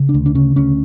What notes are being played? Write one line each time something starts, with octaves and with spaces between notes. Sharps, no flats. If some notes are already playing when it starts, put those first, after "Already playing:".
Already playing: C#3
D4
D2
D4
C#3 C#4
D2 C#4